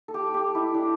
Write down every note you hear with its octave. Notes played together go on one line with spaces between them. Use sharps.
A4
G4
G4
E4
D4